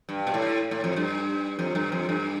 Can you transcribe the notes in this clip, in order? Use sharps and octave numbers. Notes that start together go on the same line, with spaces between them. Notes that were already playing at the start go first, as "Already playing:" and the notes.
G2
B2
A2
A2
F2
G2
F2
G2
F2
G2